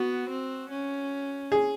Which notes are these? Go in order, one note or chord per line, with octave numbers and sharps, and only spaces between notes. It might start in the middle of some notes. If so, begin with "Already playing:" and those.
Already playing: B3 F#4
C4
C#4
G#4